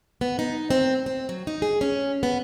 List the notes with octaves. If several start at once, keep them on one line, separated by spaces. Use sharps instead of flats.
B3
D#4
C4
C4
F#3
D#4
G#4
C#4
B3